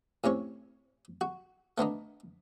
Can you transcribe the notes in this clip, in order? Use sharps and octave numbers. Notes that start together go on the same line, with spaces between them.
A2 C3 C#4 C#5
F#4
A3 B3 D4 D#4